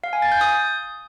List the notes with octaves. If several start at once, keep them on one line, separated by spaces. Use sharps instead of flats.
F5
G#5
A6
G6
D#6